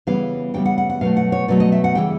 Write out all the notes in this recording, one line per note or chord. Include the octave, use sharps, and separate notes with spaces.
C#3 E3 G3 B3 F5
C#3 E3 G3 B3 G5
F#5
F#5
F#5
B2 F#3 A3 F5
F#5
C#5
B2 F#3 A3 D5
D#5
E5
F#5
C#3 E3 G3 G5